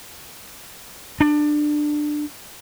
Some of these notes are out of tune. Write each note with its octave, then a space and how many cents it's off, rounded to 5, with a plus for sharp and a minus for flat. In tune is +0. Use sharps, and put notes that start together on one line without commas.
D4 +20